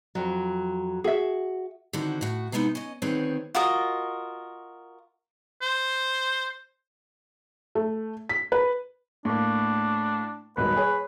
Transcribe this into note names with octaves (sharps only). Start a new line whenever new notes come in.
F2 F#3
F#4 G#4 E5
D3 D#3 C4 E4 F#4
A2 F#4
C3 G#3 B3 D#4 E4
C#4 D#5
D2 D#3 B3 C4 G#4 C#5
F4 F#4 A#4 D#5
C5
A3
B6
B4
A2 A#3 D4
D#1 G#2 B2 B4
G#4 C#5